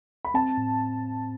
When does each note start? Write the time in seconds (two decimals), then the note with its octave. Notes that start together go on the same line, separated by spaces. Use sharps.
0.25 B5
0.34 C4 A5
0.57 A2